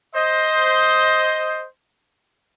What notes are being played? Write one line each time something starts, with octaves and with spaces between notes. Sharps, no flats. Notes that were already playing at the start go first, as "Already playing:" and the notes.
C5 D#5